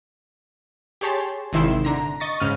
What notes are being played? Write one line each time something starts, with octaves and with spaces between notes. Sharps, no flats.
G4 G#4 C#5 A5 C6
G#1 C3 D#3 E4 C6 E7
D3 A#5
D#5 C#6 A6 A#6
G#2 C#3 F6 D#7